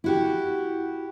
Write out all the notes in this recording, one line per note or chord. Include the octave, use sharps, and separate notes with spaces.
E4 F#4 G4